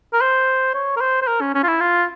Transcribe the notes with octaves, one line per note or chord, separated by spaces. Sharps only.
A#4
C5
C#5
A#4
C5
C5
A#4
C#4
C#4
F4
E4
F4